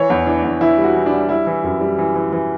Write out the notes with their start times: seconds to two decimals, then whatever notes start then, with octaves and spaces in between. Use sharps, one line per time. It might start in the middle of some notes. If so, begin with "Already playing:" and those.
Already playing: E3 C#5
0.10 E2
0.27 E3 D4
0.43 E2
0.61 E3 E4
0.78 G3
0.84 F#4
0.95 E3
1.06 D4
1.12 G3
1.29 G3 E4
1.47 E3
1.64 F#2
1.81 G3
1.98 E3
2.15 E3
2.33 E3